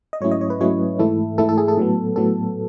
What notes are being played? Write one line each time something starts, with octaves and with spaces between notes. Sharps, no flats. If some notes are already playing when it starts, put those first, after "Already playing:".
D#5
G#2 F#3 A3 C#4 E4 C#5
D#5
C#5
B4
G#2 F#3 A3 C#4 E4 C#5
G#2 E3 A3 E4 A4
G#2 E3 A3 E4 A4
A4
G#4
A4
A2 F#3 B3
A2 F#3 B3 A4